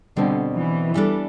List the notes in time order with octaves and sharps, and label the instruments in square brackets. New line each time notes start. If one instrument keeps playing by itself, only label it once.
[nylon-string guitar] B2 G3 C4 [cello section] D3
[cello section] E3
[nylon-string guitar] E3 G3 D4 A4